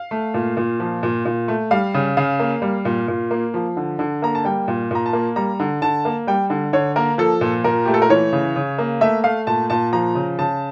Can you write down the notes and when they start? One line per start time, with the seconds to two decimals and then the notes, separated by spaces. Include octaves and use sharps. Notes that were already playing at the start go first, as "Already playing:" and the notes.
Already playing: F5
0.11 A3
0.34 A#2
0.57 A#2
0.80 F3
1.03 A#2
1.25 A#2
1.48 A3
1.71 G3 F5
1.94 C#3
2.17 C#3 F5
2.39 A#3
2.62 G3
2.85 A#2
3.08 A#2
3.31 A#3
3.54 F3
3.77 D3
3.99 D3
4.22 A#3 A#5
4.35 A5
4.45 G3 G5
4.68 A#2
4.91 A#2 A#5
5.06 A5
5.13 A#3
5.36 G3 A#5
5.60 D3
5.82 D3 A5
6.05 A#3
6.27 G3 G5
6.50 D3
6.73 D3 C#5
6.96 A#3 A#4
7.18 F3 A4
7.41 A#2
7.64 A#2 A#4
7.85 A3 G4
7.94 A4
8.02 A#4
8.10 E3 C#5
8.32 C#3
8.56 C#3
8.78 A#3
9.01 A3 E5
9.24 A3 F5
9.47 A#2 A5
9.70 A#2 A5
9.93 F3 A#5
10.15 C#3
10.39 C#3 A5